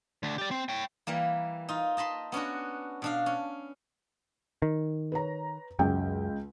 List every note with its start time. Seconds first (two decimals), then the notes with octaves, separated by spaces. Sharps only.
0.23 D3 A3
0.38 G4 D5
0.51 C4
0.69 C#5 G5
1.07 E3 G3 A#3
1.69 D#4 F4
1.97 D#5 A5 B5 C6
2.32 B3 C#4 D4 F#4
3.02 B2 D4 F5
3.26 C#4
4.62 D#3
5.12 B4 C#5 A#5
5.79 C#2 F#2 G5